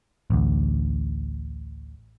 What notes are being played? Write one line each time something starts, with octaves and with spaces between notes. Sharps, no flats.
A1 D2